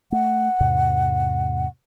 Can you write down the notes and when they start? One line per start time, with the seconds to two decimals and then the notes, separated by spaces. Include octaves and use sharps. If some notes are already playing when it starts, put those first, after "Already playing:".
0.12 A3 F#5
0.60 E2 G#2 C3